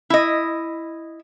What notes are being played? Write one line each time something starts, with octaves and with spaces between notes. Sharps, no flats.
E4 D#5